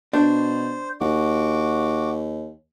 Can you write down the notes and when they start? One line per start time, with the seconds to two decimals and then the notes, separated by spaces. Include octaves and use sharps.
0.13 B2 D4 C5
1.01 D#2 F#4 D6